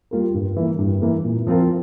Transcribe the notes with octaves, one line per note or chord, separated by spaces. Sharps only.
G3 A#3 F4 A#4
G2
E3 A#3
G2
E3 A#3
A#2
F3 C4 F4 A#4